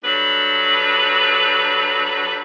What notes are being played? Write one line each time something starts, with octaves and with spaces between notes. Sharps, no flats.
G2 F#3 A4 B4